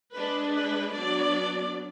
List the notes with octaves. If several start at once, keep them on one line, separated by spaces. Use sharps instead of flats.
G#3 D4 B4
B4
F#3 B3 D4 D5